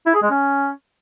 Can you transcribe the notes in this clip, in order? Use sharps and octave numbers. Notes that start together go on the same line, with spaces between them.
E4
G#4
G#3
C#4